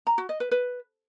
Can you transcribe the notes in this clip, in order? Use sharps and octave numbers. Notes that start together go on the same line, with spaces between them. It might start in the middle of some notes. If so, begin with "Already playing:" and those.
A#5
F#4
D#5
B4
B4